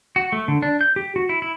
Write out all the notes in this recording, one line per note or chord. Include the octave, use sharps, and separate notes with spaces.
F#4
A3
D3
D4
G6
G4
F#4
E4
E4